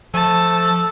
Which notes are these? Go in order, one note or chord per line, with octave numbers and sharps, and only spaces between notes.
F3 A3 A5